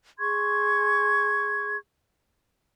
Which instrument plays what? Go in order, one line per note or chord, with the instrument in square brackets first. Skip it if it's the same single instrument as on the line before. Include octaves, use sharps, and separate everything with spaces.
[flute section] G#4 C6 C#6 G#6